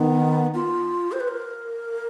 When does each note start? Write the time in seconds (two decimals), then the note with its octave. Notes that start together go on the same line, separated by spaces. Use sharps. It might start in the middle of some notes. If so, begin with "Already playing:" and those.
Already playing: D#3 B3
0.54 F4
1.12 C5
1.20 B4
1.28 A#4